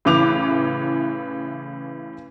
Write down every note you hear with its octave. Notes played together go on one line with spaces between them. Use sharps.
A2 C#3 E3 D6 F7